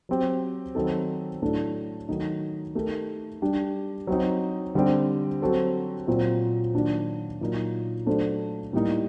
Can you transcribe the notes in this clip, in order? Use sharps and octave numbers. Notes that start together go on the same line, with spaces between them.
F#3 C4 G4
D#3 F#3 C4 D#4 A4
A2 F#3 A3 D4 A4
D#3 F#3 A3 D#4
A3 D#4 G4 A#4
G3 D4 G4
F#3 C4 D#4
D3 G3 C4 G4
F#3 C4 F#4 A4 C5
A#2 F#3 C4
D#3 F#3 A#3 D4 F#4
A#2 F#3 A#3 D#4
F#3 A3 D4 A4 C5
A2 G3 A#3 D#4